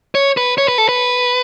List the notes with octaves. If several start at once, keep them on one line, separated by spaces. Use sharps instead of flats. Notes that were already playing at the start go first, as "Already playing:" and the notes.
C#5
B4
C#5
B4
A4
B4